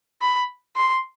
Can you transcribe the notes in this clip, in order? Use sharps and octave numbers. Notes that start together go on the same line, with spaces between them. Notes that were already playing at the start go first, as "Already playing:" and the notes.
B5
C6